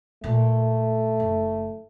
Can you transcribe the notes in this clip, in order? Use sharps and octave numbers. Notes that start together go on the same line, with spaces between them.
A#2 A3
F#1